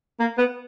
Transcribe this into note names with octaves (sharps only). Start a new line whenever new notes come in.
A#3
B3